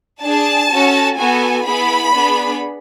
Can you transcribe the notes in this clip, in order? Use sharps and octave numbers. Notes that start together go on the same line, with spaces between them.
D4 G#4 A5
C#4 F#4 A4
B3 F#4 A4 G#5
B3 E4 G#4 B5
B3 D4 G#4